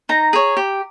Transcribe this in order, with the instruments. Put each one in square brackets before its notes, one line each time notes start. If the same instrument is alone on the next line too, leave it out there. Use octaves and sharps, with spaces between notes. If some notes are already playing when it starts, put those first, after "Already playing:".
[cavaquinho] D#4 A#5
G#4 C#5
G4